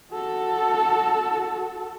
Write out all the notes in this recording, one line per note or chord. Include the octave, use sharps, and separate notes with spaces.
F#4 A4